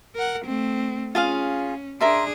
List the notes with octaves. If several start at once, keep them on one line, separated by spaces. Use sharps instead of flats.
A#4 F#5
A3 C4
C#4 F4 G#4 F5
D4 G#4 A#4 E5 C6